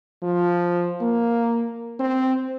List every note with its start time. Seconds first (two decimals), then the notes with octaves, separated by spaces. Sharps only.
0.23 F3
1.01 A#3
2.00 C4